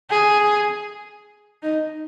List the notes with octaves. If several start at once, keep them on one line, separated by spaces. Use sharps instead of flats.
G#4
D#4